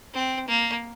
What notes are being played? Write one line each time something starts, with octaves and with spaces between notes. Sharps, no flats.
C4
A#3